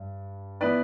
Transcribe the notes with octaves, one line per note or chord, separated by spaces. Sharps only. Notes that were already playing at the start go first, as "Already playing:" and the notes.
Already playing: G2
E3 B3 E4 B4 D5